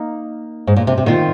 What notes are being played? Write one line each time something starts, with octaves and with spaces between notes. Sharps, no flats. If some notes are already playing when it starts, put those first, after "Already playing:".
Already playing: A#3 D#4
G#2
A#2
C3
C3
A#2 D#3 C4 F4